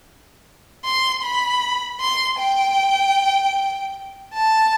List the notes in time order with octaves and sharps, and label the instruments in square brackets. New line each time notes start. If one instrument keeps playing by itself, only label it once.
[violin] C6
B5
C6
G5
A5